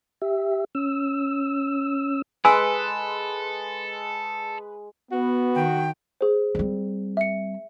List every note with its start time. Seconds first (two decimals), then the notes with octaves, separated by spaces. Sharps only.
0.22 G4 E5
0.75 C#4 E6
2.45 G#3 A4 B4 G#5 E6
5.12 B3 F#4
5.55 D#3 G5
6.21 G#4 C5
6.55 G3 C4
7.17 E5 C#7